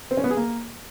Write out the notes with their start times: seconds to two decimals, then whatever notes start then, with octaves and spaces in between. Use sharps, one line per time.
0.11 C4
0.17 C#4
0.24 B3
0.30 G#4
0.37 A#3